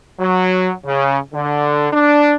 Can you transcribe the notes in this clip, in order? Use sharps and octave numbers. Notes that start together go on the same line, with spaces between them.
F#3
C#3
D3
D4